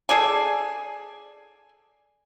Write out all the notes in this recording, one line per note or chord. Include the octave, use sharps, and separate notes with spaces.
G#4 A4 D5 G#5